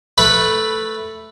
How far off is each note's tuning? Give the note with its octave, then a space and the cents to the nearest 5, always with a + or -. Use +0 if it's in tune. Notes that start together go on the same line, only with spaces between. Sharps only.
A3 +0 B4 +0 B5 -10